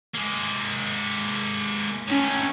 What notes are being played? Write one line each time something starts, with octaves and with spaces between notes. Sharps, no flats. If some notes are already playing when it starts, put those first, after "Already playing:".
G#3 A#3
A2 D#3 C#4